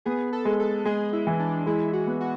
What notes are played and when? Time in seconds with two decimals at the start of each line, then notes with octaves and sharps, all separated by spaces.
0.05 B3 G#4
0.33 A4
0.45 G#3
0.59 A4
0.85 G#3 G#4
1.13 E4
1.27 E3
1.39 D4
1.66 G#3 E4
1.93 F#4
2.07 B3
2.20 F#4